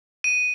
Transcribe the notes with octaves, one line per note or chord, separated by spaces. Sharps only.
D#7